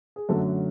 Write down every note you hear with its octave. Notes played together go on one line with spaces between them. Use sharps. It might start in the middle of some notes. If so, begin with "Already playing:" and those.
G#4
F#2 D3 F#3 A3 A4